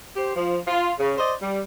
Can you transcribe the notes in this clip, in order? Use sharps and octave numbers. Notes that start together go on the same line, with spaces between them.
G4 C5
F3
F4
C#3
C5 D5 D#5
G3